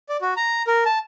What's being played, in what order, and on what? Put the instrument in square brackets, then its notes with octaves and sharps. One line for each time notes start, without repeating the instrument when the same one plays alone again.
[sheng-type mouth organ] D5
F#4
A#5
A#4
A5